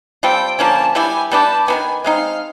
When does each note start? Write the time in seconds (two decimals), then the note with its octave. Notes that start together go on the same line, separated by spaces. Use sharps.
0.23 G3 C4 F4 A4 G5
0.59 D3 F3 A#3 C#4 A5
0.95 G3 B3 E4 G4 G#5
1.31 G3 B3 D4 G4 A5
1.68 D#3 F#3 B3 G#5
2.04 G#3 C4 D#4 F5